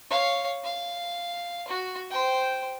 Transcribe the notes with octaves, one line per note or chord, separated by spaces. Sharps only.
C#5 F5
F5
F#4
C5 G5